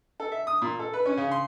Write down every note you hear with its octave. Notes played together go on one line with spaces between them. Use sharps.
A4
E5
D#6
A#2
A4
B4
C#4
C#3
C6